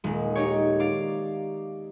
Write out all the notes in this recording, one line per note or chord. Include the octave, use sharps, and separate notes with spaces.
D#1 G#3
D#4 G4 C#5
D5 F5 D6